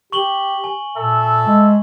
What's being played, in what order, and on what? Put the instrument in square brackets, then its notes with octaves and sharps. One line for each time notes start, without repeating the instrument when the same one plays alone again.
[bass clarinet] G4 [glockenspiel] C#6 F#7 G7
[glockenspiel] G#5
[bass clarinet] A#2 [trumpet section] A4 E5
[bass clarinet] G#3